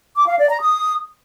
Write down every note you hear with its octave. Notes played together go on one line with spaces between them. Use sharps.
D6
F5
D5
A#5
D#6